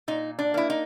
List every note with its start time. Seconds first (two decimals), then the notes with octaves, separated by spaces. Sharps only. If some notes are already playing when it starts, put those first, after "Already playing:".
0.08 A#2 D#4
0.39 D4
0.54 A#3 E4
0.70 D#4